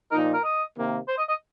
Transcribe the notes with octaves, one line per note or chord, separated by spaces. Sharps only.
A#2 F3 D#4 A#4
A#4
D#5
C3 D#3 A#3
C5
D#5
D#5